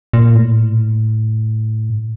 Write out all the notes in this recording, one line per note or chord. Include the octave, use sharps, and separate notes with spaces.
A#2
A2